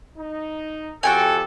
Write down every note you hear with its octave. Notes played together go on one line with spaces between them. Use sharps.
D#4
F2 F#4 G4 A4 G5 G#5